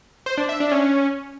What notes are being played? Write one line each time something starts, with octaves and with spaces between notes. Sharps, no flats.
C5
D4
E5
D4
C#4